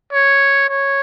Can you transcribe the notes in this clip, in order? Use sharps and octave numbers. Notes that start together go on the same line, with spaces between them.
C#5
C#5